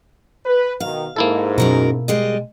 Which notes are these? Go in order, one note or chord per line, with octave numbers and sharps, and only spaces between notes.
B4
B2 D#3 F5
G#2 A#3 E4 A4
F#2 B2 F#3 A#4
G3 G#3 D#5